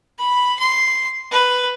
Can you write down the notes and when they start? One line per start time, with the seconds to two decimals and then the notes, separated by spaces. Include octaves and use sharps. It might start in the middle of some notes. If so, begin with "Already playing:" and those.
0.19 B5
0.59 C6
1.31 B4